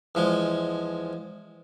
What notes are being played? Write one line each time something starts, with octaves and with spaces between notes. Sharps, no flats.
E2 F3 G#3